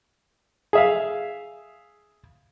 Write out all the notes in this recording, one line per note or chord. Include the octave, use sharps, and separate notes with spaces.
G#4 E5 F5